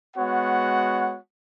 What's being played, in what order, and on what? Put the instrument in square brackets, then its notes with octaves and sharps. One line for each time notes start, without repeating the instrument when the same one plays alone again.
[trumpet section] G#3 B3 F#4 C#5 F#5